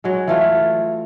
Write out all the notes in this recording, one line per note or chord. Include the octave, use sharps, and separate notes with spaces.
F#3 G#3
E3 A3 F4